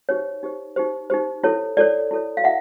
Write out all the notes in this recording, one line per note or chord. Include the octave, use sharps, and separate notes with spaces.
D#4 G4 C5 C#5
D#4 G4 C5
D#4 G4 C5
D#4 G4 C5
E4 A4 C#5
E4 A4 C#5 D5
E4 A4 C#5
F5
E4 E5 F#5